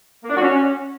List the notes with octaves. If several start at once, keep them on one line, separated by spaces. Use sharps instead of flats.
A#3
D4
F#4
C#4